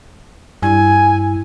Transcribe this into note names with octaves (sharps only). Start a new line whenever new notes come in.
G2 E4 G#5